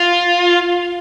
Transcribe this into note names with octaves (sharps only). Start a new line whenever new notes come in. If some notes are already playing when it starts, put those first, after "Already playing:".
Already playing: F4